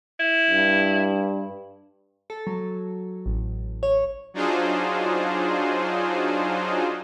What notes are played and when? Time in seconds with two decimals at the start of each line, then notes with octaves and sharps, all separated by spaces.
0.20 E4
0.51 G2
2.30 A4
2.47 F#3
3.26 A1
3.83 C#5
4.34 F#3 D4 D#4 F4 G#4 C5